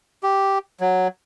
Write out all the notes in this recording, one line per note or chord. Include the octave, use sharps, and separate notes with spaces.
G4
F#3